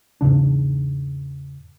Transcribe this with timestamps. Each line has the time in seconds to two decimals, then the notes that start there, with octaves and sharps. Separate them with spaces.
0.21 E2 G#2 C#3 D4